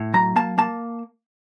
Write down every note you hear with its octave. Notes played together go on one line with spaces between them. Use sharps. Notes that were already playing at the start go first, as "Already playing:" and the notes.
Already playing: A2
F#3 A#5
A#3 A5
A#3 A5